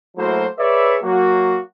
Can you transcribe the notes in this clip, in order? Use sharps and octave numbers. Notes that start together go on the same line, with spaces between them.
F#3 A3 A#3 E4 F#4 C5
G#4 B4 C#5 D5 E5
F#3 A#3 F#4